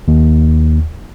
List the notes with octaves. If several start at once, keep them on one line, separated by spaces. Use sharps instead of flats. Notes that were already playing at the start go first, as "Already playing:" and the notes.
D#2